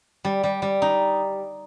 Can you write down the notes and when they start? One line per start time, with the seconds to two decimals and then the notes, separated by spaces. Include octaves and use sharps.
0.25 G3
0.44 G3
0.62 G3
0.82 D#4